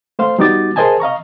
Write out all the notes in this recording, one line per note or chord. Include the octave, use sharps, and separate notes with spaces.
A3 C5 F5 C6
G3 B3 D#4 F#4 D6 A6
G#4 A#4 C5 D#5 G#5 A5
D#5 F5 A#5 C#6